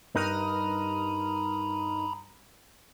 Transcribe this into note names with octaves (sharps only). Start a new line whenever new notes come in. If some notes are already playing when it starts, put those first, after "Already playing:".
G2 D#4 A#4 B4 A#5 B5 D#6 F6